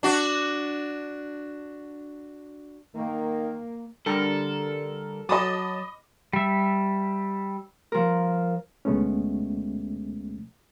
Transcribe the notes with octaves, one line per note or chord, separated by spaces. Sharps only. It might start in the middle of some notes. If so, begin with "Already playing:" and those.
D4 F#4
D#3 A#3
D3 G3 A4 A#4
F#3 D#5 A5 B5 D6 D#6
G3 E5
F3 A#4
D2 B2 G#3 A3 B3 C#4